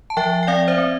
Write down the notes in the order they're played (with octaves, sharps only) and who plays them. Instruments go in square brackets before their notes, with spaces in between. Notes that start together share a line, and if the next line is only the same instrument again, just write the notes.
[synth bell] A5
F3 E5 G5
G5
C4 D5 F5
C5 E5
C4